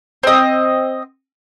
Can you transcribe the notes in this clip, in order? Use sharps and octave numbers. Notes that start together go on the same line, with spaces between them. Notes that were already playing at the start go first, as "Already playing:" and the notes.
C4 D#5